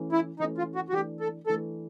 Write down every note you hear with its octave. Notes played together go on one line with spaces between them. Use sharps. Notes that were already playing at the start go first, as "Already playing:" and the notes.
Already playing: E3 A3 C#4
E4
E3 A3 C#4 D#4
F4
F#4
F#4
E3 A3 D4 G4
A4
E3 A3 D4 A4